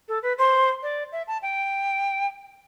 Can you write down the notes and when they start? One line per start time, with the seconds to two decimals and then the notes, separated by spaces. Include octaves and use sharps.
0.08 A4
0.23 B4
0.38 C5
0.83 D5
1.12 E5
1.27 A5
1.42 G5